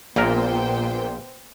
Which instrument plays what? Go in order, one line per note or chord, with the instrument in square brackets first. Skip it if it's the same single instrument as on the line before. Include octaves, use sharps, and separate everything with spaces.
[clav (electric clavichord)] A#1 A#4 [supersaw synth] A#2 [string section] B3 C5 G5